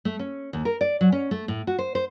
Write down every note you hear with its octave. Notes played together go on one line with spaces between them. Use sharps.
A3
C#4
D#2
A#4
D5
F#3
C#4
A3
A2
F#4
C5
C5